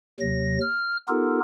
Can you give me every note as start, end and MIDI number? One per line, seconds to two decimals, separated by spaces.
0.20 0.58 39
0.20 0.58 48
0.20 0.58 54
0.20 0.58 94
0.61 0.97 89
1.08 1.40 59
1.08 1.40 63
1.08 1.40 65
1.08 1.40 67
1.08 1.40 69
1.08 1.40 70